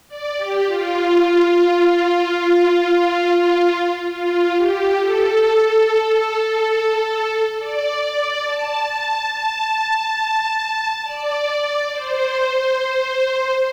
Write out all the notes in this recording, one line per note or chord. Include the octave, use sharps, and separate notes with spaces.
D5
G4
F4
F4
G4
A4
D5
D5
A5
A5
A5
D5
C5